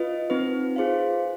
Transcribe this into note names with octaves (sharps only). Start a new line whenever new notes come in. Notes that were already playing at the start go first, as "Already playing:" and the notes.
Already playing: F4 B4 D#5
C4 D#4 B4
F4 G#4 C5 F5